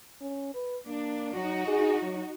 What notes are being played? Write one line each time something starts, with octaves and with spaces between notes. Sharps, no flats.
C#4
B4
A#3 D4
F#3 D#4 F#4
G#4
F#3